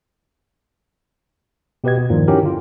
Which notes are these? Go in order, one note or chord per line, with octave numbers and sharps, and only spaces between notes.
B2 G4 B4 D#5 G#6
B2
E2 G2 A#2 D#3 F3
C#4 D#4 E4 F#4 G4 A#4
D3 F4